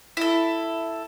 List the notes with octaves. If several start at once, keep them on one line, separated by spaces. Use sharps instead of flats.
E4 A4